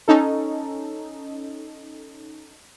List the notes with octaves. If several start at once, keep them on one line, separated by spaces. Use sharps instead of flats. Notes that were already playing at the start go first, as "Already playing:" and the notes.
C#4 D#4 A4